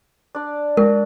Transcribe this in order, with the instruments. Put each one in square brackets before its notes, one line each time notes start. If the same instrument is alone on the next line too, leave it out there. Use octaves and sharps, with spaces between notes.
[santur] D4 D5
[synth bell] G#3 [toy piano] A#4